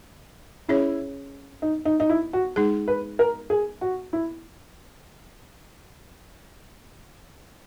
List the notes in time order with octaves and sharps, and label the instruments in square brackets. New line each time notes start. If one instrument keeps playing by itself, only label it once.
[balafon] C#4 G#4 C#5 [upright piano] E4
[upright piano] D#4
D#4
D#4
E4
F#4
[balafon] G#3 D#4 G#4
[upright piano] B4
A#4
G#4
F#4
E4